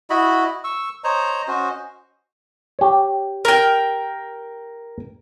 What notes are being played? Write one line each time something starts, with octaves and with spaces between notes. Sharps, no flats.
E4 F#4 D#5 B5
C#6 E6
C5 C#5 D#5 A#5
C#4 F#4 C5 D#5
G4 C#5
A#4 G5